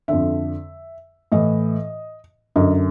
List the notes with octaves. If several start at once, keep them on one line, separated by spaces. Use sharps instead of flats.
F2 D3 E5
A2 E3 D#5
F#2 D3 D#5